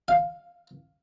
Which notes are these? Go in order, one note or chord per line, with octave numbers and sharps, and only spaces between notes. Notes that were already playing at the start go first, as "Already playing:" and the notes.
F5